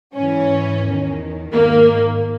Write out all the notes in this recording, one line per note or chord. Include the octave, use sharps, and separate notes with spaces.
G#2 E3 C#4
E2 D#3
G#2 D#3 A#3